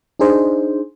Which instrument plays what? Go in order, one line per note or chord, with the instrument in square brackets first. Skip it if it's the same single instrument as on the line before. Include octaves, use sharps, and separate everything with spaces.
[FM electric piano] D4 D#4 G#4 C5